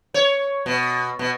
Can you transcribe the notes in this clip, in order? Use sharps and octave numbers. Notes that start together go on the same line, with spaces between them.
C#5
B2
B2